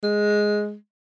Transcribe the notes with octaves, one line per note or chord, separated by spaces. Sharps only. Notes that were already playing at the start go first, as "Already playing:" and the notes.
G#3